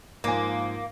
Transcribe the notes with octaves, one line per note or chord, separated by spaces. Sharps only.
G#2 F3 A#3 G#5